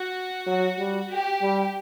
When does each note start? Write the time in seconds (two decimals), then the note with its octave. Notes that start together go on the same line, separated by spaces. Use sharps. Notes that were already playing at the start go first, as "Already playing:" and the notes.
Already playing: F#4
0.47 F#3
0.79 G3
1.10 G4
1.42 G3